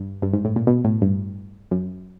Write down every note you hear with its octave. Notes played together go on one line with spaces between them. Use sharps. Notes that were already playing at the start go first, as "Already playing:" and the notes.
Already playing: G2
G2
G#2
A2
A#2
B2
A2
G2
F#2